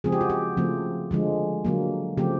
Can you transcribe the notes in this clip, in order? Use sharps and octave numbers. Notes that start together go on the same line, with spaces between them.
C#3 F3 G#3 C4 G#4
G4
F#4
G4
C#3 F3 A3 C4
D3 F3 G#3
D3 F#3 A#3
C#3 F3 A3 C4 G4